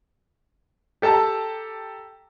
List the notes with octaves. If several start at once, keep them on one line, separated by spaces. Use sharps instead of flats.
G4 A4 A5 A#5